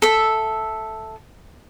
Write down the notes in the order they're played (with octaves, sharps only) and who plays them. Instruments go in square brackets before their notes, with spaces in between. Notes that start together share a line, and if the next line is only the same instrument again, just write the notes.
[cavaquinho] A4 E5